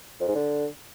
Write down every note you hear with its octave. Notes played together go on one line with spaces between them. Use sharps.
F2
G#2
D3